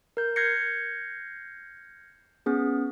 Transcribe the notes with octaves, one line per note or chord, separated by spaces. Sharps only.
A#4 G6
F6 G6 G#6 A#6 C7 C#7
B3 C#4 G#4